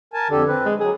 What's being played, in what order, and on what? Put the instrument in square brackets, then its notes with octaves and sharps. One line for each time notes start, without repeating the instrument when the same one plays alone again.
[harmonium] A#4 G#5 A5
[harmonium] F2 G4 A4 [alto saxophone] D3
[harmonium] C4 B4
[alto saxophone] G#3
[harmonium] F#3 [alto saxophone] G#4